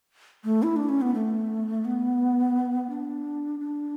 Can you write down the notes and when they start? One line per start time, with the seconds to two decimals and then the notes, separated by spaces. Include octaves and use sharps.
0.44 A3
0.63 E4
0.76 D4
0.89 C#4
1.02 B3
1.14 A3
1.85 B3
2.90 D4
3.60 D4